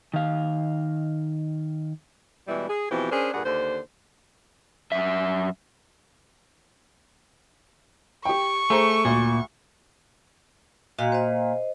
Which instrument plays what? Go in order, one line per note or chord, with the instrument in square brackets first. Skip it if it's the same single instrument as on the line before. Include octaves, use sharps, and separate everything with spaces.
[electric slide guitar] D#3 F5
[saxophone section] B2 E3 G3 G#3 E4
G#4
B2 E3 F3 C4 G4
C#4 D4 G#4 A#4 C5
G2 A#2 G#4 F#5
D#2 D3 C5
[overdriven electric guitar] F#2 E5
[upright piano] G4 G5 [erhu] C#6
[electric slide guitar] A3 [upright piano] G#4 C5 A#5
[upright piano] D2 [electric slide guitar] A#2
[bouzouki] A#2 [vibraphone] F#4 D#5
[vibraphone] C5 D#5